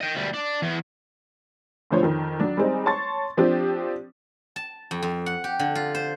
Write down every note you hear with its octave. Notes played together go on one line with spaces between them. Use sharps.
D#5 G5
D2 G3
D4
E2
A2 D3 F3 C5 C#5
F2 D#3
F#3 D4
G3 G#3 C4 D#4
C#5 A5 C6 C#6 A6
F3 C4 D4 G4
A5
F2
F2
F#5
G4
D3
F4
C5